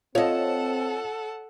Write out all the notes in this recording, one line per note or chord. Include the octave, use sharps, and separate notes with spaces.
C4 F4 A4 C#5 D#5 F#5 A5